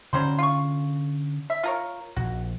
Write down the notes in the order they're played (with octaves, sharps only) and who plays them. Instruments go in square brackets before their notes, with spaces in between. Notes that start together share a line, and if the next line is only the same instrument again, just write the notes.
[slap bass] D3 C#4 [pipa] F#3 G3 C5
[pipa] F4 C#6
E5
F4 A#4 C#5
[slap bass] A#1 [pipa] F#4